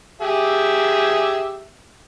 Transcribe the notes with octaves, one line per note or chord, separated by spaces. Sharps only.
G4 G#4 E5